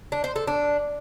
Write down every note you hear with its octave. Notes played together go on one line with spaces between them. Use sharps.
D4
C5
A4
D4